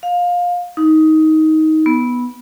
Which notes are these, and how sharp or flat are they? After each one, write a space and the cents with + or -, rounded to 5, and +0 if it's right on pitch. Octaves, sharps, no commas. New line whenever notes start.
F5 +20
D#4 +15
B3 -10